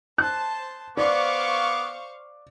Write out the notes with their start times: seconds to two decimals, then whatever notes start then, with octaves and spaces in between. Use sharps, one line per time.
0.18 C5 A5 F#6
0.97 B3 C5 D5 F5 C#6 D6